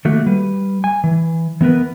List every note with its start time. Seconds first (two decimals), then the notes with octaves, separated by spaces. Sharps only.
0.05 D#3 F#3 A3 A#3 F#4
0.26 G3 B4
0.84 G#5
1.04 E3
1.61 E3 B3 A#4 B4